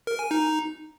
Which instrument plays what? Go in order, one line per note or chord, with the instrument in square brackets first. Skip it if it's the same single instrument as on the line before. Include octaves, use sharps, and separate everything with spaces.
[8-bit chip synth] A#4
G#5
D#4